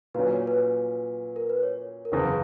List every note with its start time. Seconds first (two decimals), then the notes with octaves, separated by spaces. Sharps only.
0.14 A#2 F#3 C#4 B4
0.31 C#5
0.47 B4
1.36 A#4
1.50 B4
1.63 C#5
2.05 A#4
2.12 F#1 E2 C#3 B4